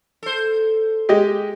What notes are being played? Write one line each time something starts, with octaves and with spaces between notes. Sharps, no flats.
A4 C5
G#3 G4 D#5